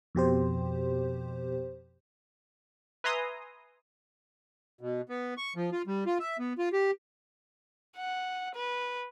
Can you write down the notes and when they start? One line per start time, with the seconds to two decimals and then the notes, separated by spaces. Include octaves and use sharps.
0.15 F2 B2 G4 C5
3.04 B4 E5 G#5 A#5 C6 D#6
4.81 B2
5.09 B3
5.37 C#6
5.56 F3
5.72 F4
5.87 G3
6.06 F4
6.20 E5
6.39 B3
6.58 F4
6.73 G4
7.97 F#5
8.55 B4